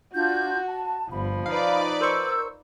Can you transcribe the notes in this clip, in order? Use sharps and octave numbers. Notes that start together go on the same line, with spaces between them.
D4 F4 F#4 G6
A5
G1 F3 B5
D#4 B4 D5 F5
A#4 C5 C#6 E6 G6